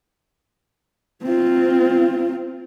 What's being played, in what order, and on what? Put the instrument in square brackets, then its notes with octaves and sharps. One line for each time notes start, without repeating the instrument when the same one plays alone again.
[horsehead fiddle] C4 F4